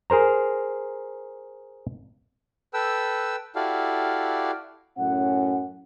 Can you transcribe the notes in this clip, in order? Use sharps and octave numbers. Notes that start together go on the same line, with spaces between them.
G#4 A#4 C5 A#5
A4 B4 G5 E6
E4 F#4 G4 A4 D5 F5
F#2 A2 C#4 F#5